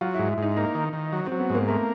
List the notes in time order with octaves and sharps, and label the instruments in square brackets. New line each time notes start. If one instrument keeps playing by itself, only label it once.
[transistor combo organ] F#3 [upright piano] F4
[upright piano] E4
[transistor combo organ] G#2
[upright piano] E4
[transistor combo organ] G#2 [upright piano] D#4
[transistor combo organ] A#3 [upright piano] D#4
[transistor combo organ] D#3
D#3
F#3
[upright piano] C4
[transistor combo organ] F#3
[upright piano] B3
[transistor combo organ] G#2
[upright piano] A#3
[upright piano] A3 [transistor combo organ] A#3